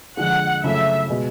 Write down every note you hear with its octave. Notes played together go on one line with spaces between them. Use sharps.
F2 D3 F3 G#3 F#5
F#2 C#3 F3 A3 E5
B2 G#3